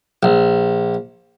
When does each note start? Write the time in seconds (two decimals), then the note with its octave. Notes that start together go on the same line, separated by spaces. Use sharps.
0.23 A#1